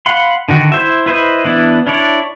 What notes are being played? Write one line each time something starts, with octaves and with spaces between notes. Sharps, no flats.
F5 F#5 B5 C6
D3 D#3 F#4
E4 C5 E5
E4 B4 C5 D#5
E3 B3 D4 E4
D4 E4 C#5 D5